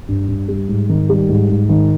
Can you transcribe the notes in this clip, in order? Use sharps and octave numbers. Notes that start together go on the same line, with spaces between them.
G2
G2
G3
G#2
D#3
G3
G#2
G#2
D#3